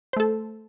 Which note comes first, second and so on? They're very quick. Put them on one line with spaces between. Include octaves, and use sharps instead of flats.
C5 A3 A4